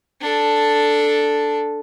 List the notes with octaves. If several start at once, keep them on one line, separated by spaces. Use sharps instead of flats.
D4 A4